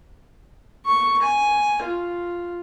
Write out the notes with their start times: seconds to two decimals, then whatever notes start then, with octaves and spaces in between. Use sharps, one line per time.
0.86 C#6
1.22 G#5
1.82 F4